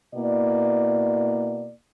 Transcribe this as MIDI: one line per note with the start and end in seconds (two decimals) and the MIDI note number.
0.15 1.71 47
0.15 1.71 58
0.15 1.71 64
0.15 1.71 74